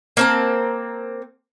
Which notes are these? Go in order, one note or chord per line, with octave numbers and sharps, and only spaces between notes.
A#3 C4 A5